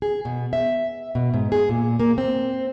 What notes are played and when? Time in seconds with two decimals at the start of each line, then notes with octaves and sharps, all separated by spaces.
0.02 G#4
0.25 B2
0.53 E5
1.15 B2
1.34 G#2
1.52 G#4
1.69 A#2
2.00 A#3
2.18 C4